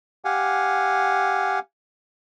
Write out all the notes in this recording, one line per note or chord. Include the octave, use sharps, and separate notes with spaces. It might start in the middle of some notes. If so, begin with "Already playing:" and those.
G4 F5 F#5 G#5